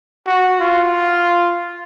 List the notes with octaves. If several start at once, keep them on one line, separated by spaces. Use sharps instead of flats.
F#4
F4